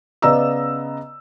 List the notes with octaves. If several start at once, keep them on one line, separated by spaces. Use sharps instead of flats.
C#3 B3 D5 D#5 A#5 E6